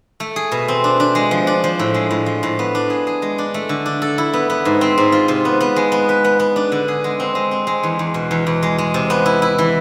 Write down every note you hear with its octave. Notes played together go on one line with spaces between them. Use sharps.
A3
G#4
B2
C4
D4
D4
G#3
F3
D4
F3
A2
G#3
A2
F3
A2
B3
D4
G#4
G#4
G#3
D4
A3
D3
D4
A4
E4
B3
B3
G#2
C4
G#2
F4
C3
B3
B3
G#3
B3
B4
B3
B3
D4
D3
G#4
G#3
C4
G#3
C4
G#3
E2
E2
B2
E2
E2
G#3
G#3
C3
B3
E4
E4
E3